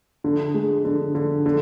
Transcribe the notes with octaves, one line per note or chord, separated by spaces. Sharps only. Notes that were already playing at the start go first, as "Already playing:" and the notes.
D3
G#3
D3
D3
D3